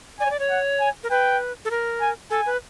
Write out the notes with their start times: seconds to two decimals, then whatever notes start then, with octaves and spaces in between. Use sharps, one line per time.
0.20 D5 G#5
0.26 C#5
0.30 D5
0.39 C#5
0.50 F#5
0.80 G#5
1.04 A#4
1.10 B4 G5
1.65 A4
1.71 A#4
2.01 G#5
2.30 A4 G#5
2.46 B4